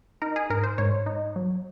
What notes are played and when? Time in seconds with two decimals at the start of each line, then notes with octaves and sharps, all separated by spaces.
0.22 D#4 A#4
0.36 G#4
0.50 G#2 A#4
0.63 C5
0.78 G#2 C#5
1.06 D#4
1.36 F#3